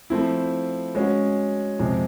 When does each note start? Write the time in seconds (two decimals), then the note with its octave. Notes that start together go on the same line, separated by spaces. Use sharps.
0.10 F3 A3 C4 E4
0.95 G#3 C#4 F#4
1.79 F2 C3 F3 G#3